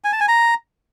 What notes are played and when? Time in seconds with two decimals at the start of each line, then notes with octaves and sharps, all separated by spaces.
0.04 G#5
0.12 A5
0.20 G#5
0.28 A#5